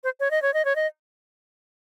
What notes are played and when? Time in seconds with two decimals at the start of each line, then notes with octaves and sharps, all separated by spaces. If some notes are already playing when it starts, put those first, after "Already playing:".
0.04 C5
0.20 C#5
0.31 D#5
0.42 C#5
0.54 D#5
0.65 C#5
0.76 D#5